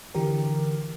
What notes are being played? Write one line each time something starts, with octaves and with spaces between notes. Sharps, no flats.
D3 E3 G4 A#4